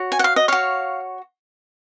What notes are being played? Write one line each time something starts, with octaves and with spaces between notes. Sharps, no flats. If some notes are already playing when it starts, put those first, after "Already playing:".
Already playing: F#4 C#5
G#5
F#5
F5
D#5
F#4 C#5 F5